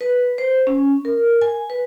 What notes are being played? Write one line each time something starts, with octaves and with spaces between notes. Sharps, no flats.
B4
C5
C#4
A#4
G#5
B4